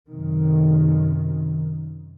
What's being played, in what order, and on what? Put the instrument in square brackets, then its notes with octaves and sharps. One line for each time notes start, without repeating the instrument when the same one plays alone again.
[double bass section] F#2 C3 D#3